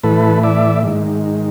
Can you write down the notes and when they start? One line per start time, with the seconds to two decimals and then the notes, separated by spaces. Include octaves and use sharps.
0.03 A2 E3 A4 B4
0.43 D5 E5
0.83 G#2 D#3